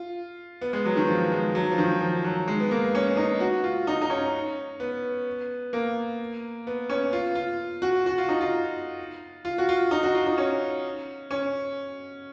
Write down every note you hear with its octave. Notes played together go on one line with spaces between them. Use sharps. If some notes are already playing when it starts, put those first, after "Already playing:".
Already playing: F4
B3
G#3
F#3
D#3
F3
G#3
F#3
F3
D#3
F3
F#3
G#3
B3
A#3
C#4
D#4
F#4
F4
D#4
D#4
C#4
B3
A#3
B3
C#4
F4
F4
F#4
F#4
F4
D#4
F4
F4
F#4
F4
D#4
F#4
F4
D#4
C#4
C#4